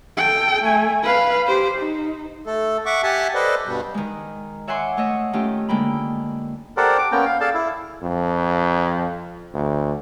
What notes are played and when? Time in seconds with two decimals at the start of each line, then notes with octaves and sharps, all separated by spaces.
0.17 A4 G5
0.63 A3 G#5
1.03 B4 F5
1.47 G4 C5
1.79 D#4
2.46 A3 A4
2.86 E5 F#5 C#6 D6
3.03 G4 E5 F#5 G#5 A5
3.35 A4 B4 C5 D5 D#5
3.66 G2 B2 G3
3.94 D#3 G#3
4.67 C#5 E5 F#5 G#5 C6 D6
4.97 A3 C#5 D#5 E5
5.33 D#3 A3 C#4 F4 G4
5.69 D3 G#3 A#3 G5 B5
6.77 G4 A4 A#4 C5 D5 F#5
6.98 D6
7.12 A#3 B3 C#4 G5 A#5
7.25 F5
7.40 G#4 A4 D5 F5 A5
7.54 E4
8.03 F2
9.54 D2